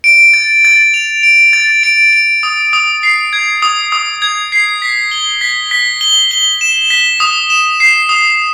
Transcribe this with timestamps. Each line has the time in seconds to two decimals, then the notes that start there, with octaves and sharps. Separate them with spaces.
0.04 D7
0.34 A6
0.65 A6
0.94 F7
1.23 D7
1.53 A6
1.83 D7
2.13 D7
2.43 D#6
2.73 D#6
3.03 C7
3.33 G#6
3.62 D#6
3.92 D#6
4.22 G#6
4.52 C7
4.82 B6
5.11 G7
5.41 B6
5.71 B6
6.01 G7
6.31 G7
6.61 E7
6.90 B6
7.20 D#6
7.50 E7
7.80 C7
8.09 D#6